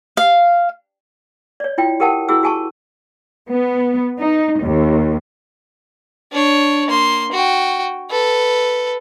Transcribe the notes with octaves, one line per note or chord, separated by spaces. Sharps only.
F5
C#5 D5
E4 F4 G5
G4 A4 A#4 F#5 G5 A5
E4 F#4 G#4 E6
F#4 G#4 G#5 A5 C#6
B3
D#4
D#2
D4 C#5
A#3 C6
F#4 G5
A4 B4